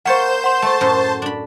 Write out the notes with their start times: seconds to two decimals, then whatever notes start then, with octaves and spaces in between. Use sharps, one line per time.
0.05 A#3 C5 C#5 F#5 A5 G6 E7
0.44 F#5 C6
0.62 A3 C5 A5
0.81 F#2 A2
1.22 D4 B5